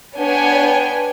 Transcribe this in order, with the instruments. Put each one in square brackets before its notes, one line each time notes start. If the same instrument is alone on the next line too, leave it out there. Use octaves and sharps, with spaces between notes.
[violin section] B3 D4 C#5 G5 G#5